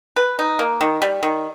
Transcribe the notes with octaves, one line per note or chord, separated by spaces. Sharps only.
B4
D#4
A#3
D#3
G3
D#3